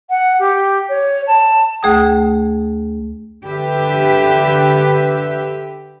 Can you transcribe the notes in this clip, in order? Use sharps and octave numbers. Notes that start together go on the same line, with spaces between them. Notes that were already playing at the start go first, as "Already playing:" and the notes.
F#5
G4
C#5
A5
D2 A3 G#4 G5 D#6
D3 G4 B4 E5